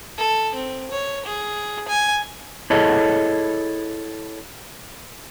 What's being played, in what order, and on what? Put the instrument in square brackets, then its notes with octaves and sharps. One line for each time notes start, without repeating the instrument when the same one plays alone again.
[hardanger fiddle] A4
C4
C#5
G#4
G#5
[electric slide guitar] E4 G#4 A4 C#5 D#5